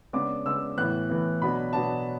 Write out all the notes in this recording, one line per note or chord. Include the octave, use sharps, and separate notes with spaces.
C#3 G#3 B3 D4 D6
C#3 G#3 B3 D4 E6
A2 E3 B3 F#6
A2 E3 B3
B2 F#3 B3 D4 B5
B2 F#3 B3 D4 A5